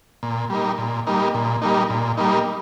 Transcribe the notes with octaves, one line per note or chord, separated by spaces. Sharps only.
A#2
G3 A#3 D#4
A#2
G3 A#3 D#4
A#2
G3 A#3 D#4
A#2
G3 A#3 D#4